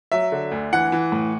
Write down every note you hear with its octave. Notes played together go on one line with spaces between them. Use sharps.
F#3 E5
D3
D2
E3 F#5
E3
A2